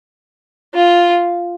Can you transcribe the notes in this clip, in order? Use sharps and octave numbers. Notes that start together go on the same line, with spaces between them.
F4